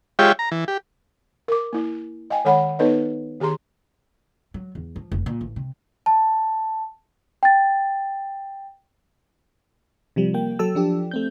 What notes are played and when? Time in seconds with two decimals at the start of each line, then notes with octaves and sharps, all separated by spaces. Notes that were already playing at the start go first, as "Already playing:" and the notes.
0.19 G#3 F4 G4 C#5 E5 G5
0.39 A#5
0.51 E3
0.68 G4
1.48 A#4 D6
1.73 A#3 E4
2.30 D#5 F5 G5 G#5
2.45 D#3 G#3 A4 C#5 F#5 B5
2.79 B3 D#4 A4 B4 C#5 D#5
3.40 D#3 G4 G#4 A#5 C6
4.54 F#3
4.75 E2
4.96 F3
5.12 F1
5.26 A#2
5.41 A1
5.56 C3
6.06 A5
7.43 G5 A6
10.16 C3 F3 G3
10.34 A#3 G5
10.59 F#3 A4 A5 E6
10.75 F3 D4 G4
11.11 A3 C4 G6